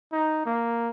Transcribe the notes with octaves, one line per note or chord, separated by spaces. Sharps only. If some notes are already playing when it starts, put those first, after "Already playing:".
D#4
A#3